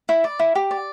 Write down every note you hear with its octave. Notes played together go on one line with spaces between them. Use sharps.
E4
D5
E4
G4
D5